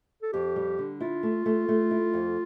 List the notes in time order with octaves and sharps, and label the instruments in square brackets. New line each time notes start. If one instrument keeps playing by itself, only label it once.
[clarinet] A4
[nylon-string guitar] F2 [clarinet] G4
[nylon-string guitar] G3
D3
[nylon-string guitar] E4 [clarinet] F4
[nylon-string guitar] A3
A3
A3
E4
F2